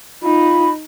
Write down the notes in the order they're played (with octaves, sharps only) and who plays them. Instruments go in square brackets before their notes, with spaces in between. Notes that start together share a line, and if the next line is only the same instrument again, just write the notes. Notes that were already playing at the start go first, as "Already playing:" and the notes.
[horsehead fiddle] D#4 [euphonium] F4 [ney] B5